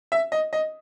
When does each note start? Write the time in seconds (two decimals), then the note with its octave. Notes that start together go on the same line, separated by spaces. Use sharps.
0.12 E5
0.32 D#5
0.53 D#5